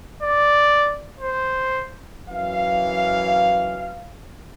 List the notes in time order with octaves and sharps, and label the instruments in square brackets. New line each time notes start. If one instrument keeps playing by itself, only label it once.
[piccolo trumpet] D5
C5
[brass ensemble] F#2 E3 F5